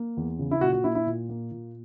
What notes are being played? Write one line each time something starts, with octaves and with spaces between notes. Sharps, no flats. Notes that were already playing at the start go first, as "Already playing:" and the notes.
Already playing: A#3
E2
C#3
E4
A#2 F#4
F#4
A#3 E4
E4
A#2
A#3
A#2